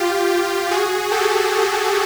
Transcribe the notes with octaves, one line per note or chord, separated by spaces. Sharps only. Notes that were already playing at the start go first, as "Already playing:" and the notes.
Already playing: F4 G4
F#4 G#4
G4 A4